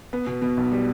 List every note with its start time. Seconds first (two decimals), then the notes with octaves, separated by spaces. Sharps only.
0.13 B3
0.27 B2
0.42 B2
0.57 B1
0.72 G3